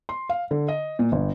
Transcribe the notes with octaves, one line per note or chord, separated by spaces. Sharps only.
C6
F5
D3
D#5
A#2
G1